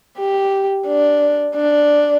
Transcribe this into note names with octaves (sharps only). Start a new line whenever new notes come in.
G4
D4
D4